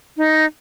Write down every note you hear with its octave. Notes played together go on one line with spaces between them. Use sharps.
D#4